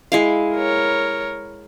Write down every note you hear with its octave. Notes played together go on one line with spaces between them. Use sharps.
G#3 E4 F5
A#4 C#5